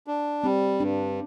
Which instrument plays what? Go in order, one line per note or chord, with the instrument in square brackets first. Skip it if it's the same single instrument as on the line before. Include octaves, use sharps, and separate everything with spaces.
[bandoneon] D4
[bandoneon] G3 [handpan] C4
[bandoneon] G2 [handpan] D4